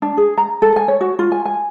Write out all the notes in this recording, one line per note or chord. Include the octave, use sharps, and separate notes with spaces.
D4
G#4
A#5
A4
G#5
C#5
F#4
F4
G#5
G#5